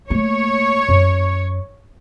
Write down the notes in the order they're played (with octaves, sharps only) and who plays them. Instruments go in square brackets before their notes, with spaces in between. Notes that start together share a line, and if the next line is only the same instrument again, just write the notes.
[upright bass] A3 A#3 [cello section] C#5
[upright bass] F#2